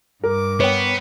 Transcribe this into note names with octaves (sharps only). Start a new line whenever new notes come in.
G2 A#4 D6
B3 C#5 G5